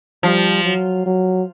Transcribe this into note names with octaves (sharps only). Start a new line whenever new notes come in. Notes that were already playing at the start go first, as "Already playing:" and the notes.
F3 G3
F#3
F#3